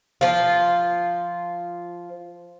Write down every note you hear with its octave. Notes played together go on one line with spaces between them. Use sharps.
F3 F4